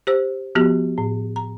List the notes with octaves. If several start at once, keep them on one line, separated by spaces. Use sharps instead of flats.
G4 C5 E6
F3 B3 F#4 G4
A2
A#5